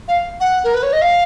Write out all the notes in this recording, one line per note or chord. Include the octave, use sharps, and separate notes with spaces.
F5
F#5
A#4
B4
C#5
D#5
F5